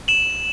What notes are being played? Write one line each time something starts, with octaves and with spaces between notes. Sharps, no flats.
E7 F#7